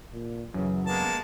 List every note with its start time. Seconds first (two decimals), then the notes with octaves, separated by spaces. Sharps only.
0.13 A#2
0.54 F#2 C#3 E3 F#3
0.86 C3 G#3 A#3 B3 A5